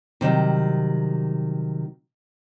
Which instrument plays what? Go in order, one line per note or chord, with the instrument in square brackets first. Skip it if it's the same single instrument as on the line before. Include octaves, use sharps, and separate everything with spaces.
[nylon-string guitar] C3 D#3 F#3 G3